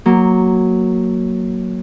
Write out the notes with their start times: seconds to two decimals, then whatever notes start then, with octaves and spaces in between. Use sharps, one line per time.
0.06 F#3 A#3